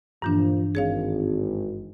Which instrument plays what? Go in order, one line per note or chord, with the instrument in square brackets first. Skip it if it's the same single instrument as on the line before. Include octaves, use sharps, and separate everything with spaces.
[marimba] G2 E3 D4 [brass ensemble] A#2 F3
[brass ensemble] G#1 [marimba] G#4 C#5 F5